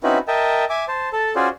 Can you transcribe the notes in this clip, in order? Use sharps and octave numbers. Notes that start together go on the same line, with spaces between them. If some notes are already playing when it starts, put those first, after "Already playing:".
C4 C#4 D#4 E4 F#4 B4
A#4 D#5 E5 G5 A5
E5 G#5 D6
C5 A5
A4 A5
C#4 F4 F#4 G#4 C5 D5